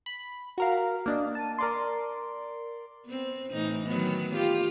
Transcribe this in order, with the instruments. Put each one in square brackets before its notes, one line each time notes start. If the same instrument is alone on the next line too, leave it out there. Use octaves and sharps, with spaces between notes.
[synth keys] B5
F#4 A#4 F5
A#3 D4 D#5
A5 D#7
A#4 D5 C6
[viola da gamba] B3 C4
A2 E3 D#4
D#3 F#3 B3
F4 G4